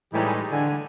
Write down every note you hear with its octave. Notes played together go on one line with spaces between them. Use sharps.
A2 E3 G3 G#3 D#4 G4
D3 G#5